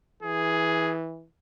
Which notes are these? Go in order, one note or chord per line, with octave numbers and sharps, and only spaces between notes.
E3 G#4